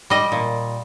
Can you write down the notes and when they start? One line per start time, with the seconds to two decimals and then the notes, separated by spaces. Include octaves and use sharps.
0.10 G3 D#5
0.32 A#2